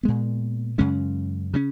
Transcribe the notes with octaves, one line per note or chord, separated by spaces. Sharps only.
A#2 G#3 B3
F#2 C#3 G#3 C#4
C#3 G#3 C#4